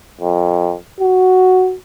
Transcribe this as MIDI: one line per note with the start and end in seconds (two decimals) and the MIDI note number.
0.21 0.74 41
1.01 1.75 66